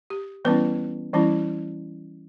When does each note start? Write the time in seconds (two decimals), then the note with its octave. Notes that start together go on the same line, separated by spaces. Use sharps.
0.10 G4
0.45 E3 G3 B3 C#4 E4 B4
1.14 E3 G3 C#4 E4